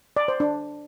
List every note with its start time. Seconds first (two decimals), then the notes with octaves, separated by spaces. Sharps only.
0.17 D5
0.28 C5
0.40 D4